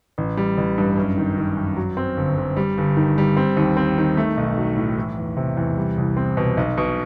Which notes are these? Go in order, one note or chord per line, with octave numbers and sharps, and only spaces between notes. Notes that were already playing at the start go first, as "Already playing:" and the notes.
A1
G3
A1
G2
F#2
D#3
D#3
F#2
F#3
C4
G1
G1
G3
G1
D#3
G3
C4
D#2
C4
D#3
A3
B1
F#3
A2
E3
E2
C3
E2
G3
C2
C4
B2
B1
B2